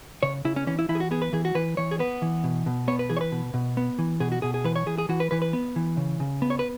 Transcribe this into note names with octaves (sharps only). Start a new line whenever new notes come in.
C#3 C#5
C#3 E4
C#4
E3 C#4
E4
E3 E4
G#4
F#4
B3 G#4
B4
E3 G#4
F#4
E3 B4
E3 C#5
G#4
B3 B4
E3
B2
B2
B3 C#5
B4
E3 G#4
C#5
B4
B2
B2
B3
E3
B2 G#4
F#4
B2 G#4
G#4
E3 B4
C#5
E3 G#4
G#4
E3 F#4
B4
E3 B4
B4
B3
E3
C#3
C#3
B3
C#5
B4